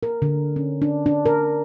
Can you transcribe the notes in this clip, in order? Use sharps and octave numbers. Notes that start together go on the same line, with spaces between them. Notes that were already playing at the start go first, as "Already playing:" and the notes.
A#4
D3
C#4
D4
D4
A#4